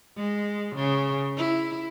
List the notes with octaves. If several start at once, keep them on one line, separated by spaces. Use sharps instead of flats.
G#3
C#3
E4